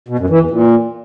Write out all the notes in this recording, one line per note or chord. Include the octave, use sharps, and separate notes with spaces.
B2
F#2
E3
E2
A#2